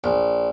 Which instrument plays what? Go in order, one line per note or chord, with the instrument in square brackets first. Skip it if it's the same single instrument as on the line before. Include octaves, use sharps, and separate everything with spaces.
[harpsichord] A#1